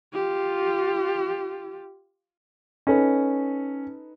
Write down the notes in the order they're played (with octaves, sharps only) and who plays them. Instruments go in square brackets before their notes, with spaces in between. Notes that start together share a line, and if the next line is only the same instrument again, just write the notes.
[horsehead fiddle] F4 G4
[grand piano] C#4 [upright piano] D#4 A4 B4